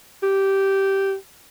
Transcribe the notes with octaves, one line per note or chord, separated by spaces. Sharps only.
G4